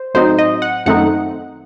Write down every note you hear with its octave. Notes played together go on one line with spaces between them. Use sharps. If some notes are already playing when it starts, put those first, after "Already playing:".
Already playing: C5
A2 F#3 C4 D#4 C5
D#5
F#5
F#2 D#3 A3 C4 D#4 F#5